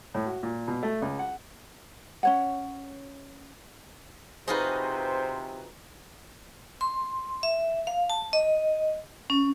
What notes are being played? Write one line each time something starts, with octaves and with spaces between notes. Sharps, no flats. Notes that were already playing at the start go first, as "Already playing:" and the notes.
A2
F#4
A#2
B2
A3
C#2
F#5
C#4 C#5 F#5
C3 D#4 F4 F#4 G#4 B4 C5
C6
E5
F5
A5
D#5
C#4